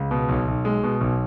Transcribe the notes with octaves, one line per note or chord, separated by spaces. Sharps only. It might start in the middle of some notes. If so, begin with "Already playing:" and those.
Already playing: C#2
B2
B1
B1
G#3
B2
B1